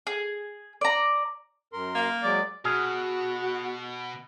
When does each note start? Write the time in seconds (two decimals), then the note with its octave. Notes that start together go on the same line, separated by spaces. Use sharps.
0.07 G#4
0.81 D5 A#5
1.73 F#2 A#4 C6
1.95 A#3
2.23 F#3 G#3 D5
2.65 B2 F#4 G#4 E6 F6